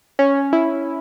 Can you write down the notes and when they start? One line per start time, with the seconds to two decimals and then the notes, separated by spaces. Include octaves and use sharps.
0.19 C#4
0.53 E4